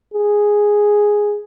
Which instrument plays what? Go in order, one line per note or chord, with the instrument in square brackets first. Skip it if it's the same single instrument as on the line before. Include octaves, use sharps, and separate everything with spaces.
[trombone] G#4